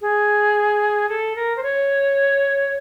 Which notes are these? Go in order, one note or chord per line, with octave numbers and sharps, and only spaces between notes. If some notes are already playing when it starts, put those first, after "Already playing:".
G#4
A4
A#4
C5
C#5